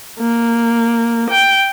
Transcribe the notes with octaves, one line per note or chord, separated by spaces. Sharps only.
A#3
G5